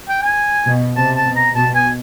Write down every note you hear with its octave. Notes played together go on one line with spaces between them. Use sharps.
G5
G#5
B2
C3 A5
A5
B2
A#5
B2 A5
G#5